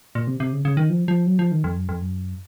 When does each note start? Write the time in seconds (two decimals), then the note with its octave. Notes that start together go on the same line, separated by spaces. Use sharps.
0.15 A#2
0.27 C3
0.40 C3
0.53 C#3
0.65 C#3
0.77 D#3
0.90 F3
1.08 F3
1.27 F#3
1.39 F3
1.52 D#3
1.64 F2
1.76 F#2
1.89 F2
2.02 F#2